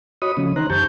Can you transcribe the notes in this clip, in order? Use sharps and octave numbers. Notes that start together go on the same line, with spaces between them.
F#4 C#5 D#5 B5 D#6
C#3 F3 A3 C#4
D#3 D#4 C5 A#5 F#6
F#2 G4 A5 C#6 G6